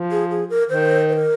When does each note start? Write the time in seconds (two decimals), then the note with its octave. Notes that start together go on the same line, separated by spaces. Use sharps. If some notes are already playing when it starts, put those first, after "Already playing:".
Already playing: F3
0.11 G#4
0.31 G#4
0.50 A#4
0.69 D#3 C5
1.09 C5
1.13 A#4